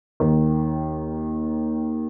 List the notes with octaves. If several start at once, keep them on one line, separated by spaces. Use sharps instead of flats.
D#2 D#3